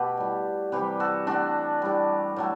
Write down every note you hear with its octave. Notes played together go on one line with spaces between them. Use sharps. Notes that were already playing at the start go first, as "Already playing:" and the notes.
Already playing: B2 A3 G4 B4
A2 G3
C3 E3 G3 G4 B4
F#4 A4
A2 E3 A3 D4 F#4
A2 G3
A2 F#3 A3